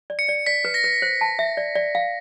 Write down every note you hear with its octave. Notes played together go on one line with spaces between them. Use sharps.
D5
C#7
D5
D5 B6
B4
A#6
B4
C5
A5
E5
D5
D5
F5